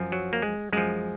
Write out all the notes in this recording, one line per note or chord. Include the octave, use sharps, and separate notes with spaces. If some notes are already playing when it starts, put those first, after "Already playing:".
Already playing: F#2 F3
F#3
A#3
G#3
F#2 F3 G#3